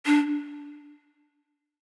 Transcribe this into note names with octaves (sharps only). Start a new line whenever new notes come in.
D4